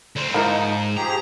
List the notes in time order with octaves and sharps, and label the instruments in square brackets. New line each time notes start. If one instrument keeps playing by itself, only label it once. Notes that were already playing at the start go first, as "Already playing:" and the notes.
[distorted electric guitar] D2 C4
[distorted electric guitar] G#2 [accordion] F3 D#4 [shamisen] A#3 E4 A#4
[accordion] F3 G4 G#4 [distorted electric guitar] A#5